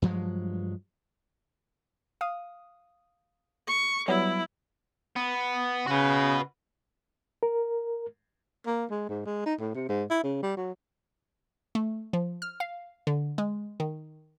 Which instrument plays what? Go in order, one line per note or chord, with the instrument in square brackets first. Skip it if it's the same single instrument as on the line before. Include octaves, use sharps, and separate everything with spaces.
[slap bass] G2 F3 F#3 G#3
[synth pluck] F5 D#6
[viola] C#6
[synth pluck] F#3 G3 B3 [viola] E4
[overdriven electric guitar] B3
[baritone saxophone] C#3 [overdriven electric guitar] F#4 B4
[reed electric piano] A#4
[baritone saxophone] A#3
G#3
G#2
G#3
D#4
A2
C3
G#2
E4
C#3
G3
F#3
[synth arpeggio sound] A3
F3
F6
F5
D3
G#3
D#3